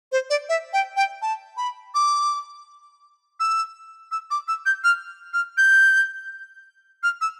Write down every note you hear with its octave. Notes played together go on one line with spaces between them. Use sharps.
C5
D5
E5
G5
G5
A5
B5
D6
E6
E6
D6
E6
G6
F6
F6
G6
F6
E6